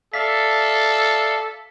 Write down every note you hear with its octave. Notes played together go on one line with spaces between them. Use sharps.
A4 D5 E5 F5 B6